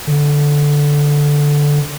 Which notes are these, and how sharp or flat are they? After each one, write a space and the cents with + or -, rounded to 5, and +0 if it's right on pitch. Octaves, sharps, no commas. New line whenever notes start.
D3 -5